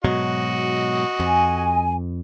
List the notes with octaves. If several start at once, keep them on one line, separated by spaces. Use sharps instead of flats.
G#2 B2 F#3 F#4 D#5
F2 G#5